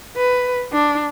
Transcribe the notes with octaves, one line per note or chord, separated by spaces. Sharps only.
B4
D4